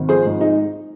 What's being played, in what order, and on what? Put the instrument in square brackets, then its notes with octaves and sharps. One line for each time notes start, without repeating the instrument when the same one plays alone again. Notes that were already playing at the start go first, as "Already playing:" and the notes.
Already playing: [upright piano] G#1
F3 G#4 C5
G#2
G#3 D#4